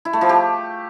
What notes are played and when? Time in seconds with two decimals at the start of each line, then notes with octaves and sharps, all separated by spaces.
0.05 E4
0.13 A3
0.21 F3
0.29 G4